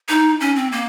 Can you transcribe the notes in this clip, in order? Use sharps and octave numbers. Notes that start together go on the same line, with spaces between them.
D#4
C#4
C4
A#3